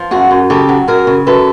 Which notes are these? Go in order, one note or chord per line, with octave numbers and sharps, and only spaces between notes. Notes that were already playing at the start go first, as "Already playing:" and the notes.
Already playing: F3
F#2 F#4 G#4
F#2
C#3 G4 A4
F#3
F#2 G#4 A#4
C#3
F#2 A4 B4